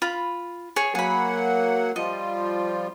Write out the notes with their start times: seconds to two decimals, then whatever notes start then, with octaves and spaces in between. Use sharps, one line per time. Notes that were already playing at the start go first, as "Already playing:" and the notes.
0.02 F4 B5
0.76 G#4 C#5
0.95 F#3 A#3 G#4 F#5 B5
1.96 F3 G3 F4 D#5